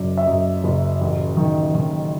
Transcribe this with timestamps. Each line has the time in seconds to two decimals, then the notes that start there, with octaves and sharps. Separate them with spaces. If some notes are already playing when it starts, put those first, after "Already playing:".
Already playing: F#1 F#2 D5
0.18 E5
0.27 F#2 D#5
0.64 F#1
1.01 A1
1.37 D#3
1.75 D#3